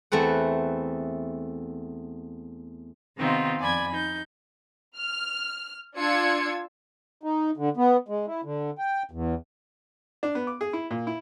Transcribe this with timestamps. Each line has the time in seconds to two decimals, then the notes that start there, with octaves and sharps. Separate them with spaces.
0.12 E2 A3 C4 B4 F#5
3.17 C3 D#3 B3 C4 D#4 F4
3.59 F2 D5 G#5 B5 G#6
3.94 D#4 G6
4.97 F6
5.97 D4 F4 E6 G#6 C#7
7.23 D#4
7.57 D3
7.77 B3
8.08 G#3
8.27 E4
8.44 D3
8.78 G5
9.11 E2
10.23 D4
10.35 B3
10.47 D6
10.61 G#4
10.73 E4
10.91 A#2
11.07 E4